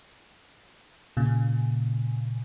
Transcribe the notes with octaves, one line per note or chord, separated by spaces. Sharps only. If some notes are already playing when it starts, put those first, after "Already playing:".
A#2 C#3